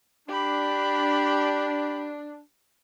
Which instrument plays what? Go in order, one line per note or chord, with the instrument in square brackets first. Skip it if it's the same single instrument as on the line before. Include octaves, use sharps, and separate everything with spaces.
[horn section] D4 [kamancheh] G4 B5